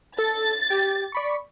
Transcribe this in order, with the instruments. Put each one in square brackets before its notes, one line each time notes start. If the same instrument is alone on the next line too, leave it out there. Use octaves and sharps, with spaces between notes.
[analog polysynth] A4 [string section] A6
[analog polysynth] G4
D5 B5 C#6